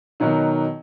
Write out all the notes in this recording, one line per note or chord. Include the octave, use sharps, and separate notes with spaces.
B2 D#3 F#3 D#4